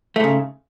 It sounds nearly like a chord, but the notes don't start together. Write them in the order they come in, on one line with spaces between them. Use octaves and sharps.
A3 G#2 C#3